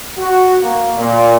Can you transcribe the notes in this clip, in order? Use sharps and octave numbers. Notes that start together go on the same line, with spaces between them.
F#4
A#3
A#2